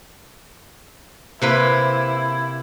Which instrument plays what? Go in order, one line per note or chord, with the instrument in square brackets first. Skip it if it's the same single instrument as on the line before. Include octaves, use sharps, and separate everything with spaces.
[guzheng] C3 A#3 B4 [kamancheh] E4